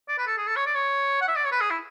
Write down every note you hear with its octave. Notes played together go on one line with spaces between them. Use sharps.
D5
B4
A4
G#4
A4
C#5
D5
C#5
F#5
E5
D5
C#5
B4
G#4
E4